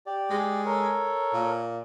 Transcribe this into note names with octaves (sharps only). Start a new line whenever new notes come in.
G4 D5
G#3
A4 A#4 C#5
A#2